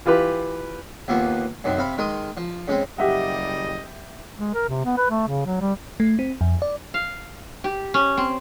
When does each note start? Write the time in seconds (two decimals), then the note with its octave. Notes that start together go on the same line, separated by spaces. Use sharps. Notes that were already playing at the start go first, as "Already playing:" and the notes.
0.06 E3 F4 G4 B4
1.08 D#2 F3 A#3 B3
1.64 F#2 C3 D#3
1.78 C3 F5 B5
1.98 D#3 G#3 A#4 C6 D#6
2.37 F3
2.68 C#3 G#3 C4
2.98 F#1 G3 G4 D#5 E5 F#5
4.38 G#3
4.54 A#4
4.69 C3
4.85 B3
4.97 B4
5.11 A3
5.28 C#3
5.46 F#3
5.61 G3
6.00 A3
6.19 C4
6.41 F2
6.62 D5
6.94 F5
7.64 G4
7.94 C#4
8.17 C4